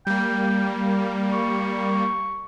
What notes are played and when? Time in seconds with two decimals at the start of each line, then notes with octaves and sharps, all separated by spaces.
0.07 G3 A#3 G5
1.33 C#6